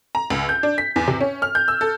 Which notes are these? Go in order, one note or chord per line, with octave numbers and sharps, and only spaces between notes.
A#5
C#2
G6
D4
B6
E2
C3
C#4
F6
G6
E6
A4